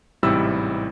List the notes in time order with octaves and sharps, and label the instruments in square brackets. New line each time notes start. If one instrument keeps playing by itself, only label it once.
[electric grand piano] A1 G#2 C3 G3 E4 E6